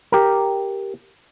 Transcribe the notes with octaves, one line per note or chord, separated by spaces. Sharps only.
G4 A#4